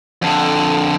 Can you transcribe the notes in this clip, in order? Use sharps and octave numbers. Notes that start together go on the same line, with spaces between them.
F2 D3